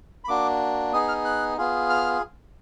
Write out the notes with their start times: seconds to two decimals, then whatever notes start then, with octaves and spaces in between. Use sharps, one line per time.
0.24 B5
0.28 A#3 D4 F#4 D6
0.92 B3 D#4 G#4 D#6
1.08 F6
1.25 F#6
1.58 B3 F4 G#4
1.90 F6